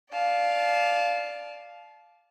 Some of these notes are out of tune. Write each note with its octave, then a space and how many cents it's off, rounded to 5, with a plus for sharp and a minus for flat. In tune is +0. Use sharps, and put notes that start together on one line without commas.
D5 +0 F5 +0 A5 -30